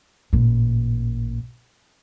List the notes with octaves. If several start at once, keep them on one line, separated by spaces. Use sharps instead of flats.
A1 A#2